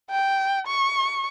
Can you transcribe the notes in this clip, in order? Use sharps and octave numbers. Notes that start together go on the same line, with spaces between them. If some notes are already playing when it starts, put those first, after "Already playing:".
G5
C#6